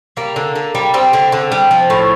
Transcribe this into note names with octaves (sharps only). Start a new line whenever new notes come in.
G3 A#3
D3
D3
G3
G3 C4
D3
D3
G3
F3
A2